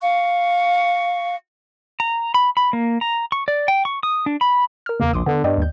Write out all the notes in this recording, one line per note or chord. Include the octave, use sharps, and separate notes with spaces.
F5 C#6
A#5
B5
B5
A#3
A#5
C#6
D5
G5
C#6
D#6
D4
B5
A#4 F6
E2 C#3 A#3
A#1 C6 D6 D#6
D3 B3
G2 D5 D#5 G5
D#2 G6